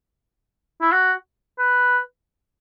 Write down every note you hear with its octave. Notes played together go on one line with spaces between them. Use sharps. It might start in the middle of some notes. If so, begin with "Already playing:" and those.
E4
F#4
B4